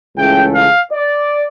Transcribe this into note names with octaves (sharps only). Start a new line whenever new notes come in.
C#2 C#3 E3 A3 G5
F5
D5